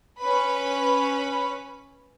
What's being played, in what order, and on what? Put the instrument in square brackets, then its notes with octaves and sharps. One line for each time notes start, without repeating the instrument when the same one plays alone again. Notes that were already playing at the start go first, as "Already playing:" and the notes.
[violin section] C#4 B4 B5